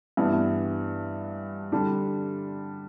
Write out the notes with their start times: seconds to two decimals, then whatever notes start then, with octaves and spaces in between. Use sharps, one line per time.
0.17 G2 E3 B3 D4
1.72 D3 G3 D4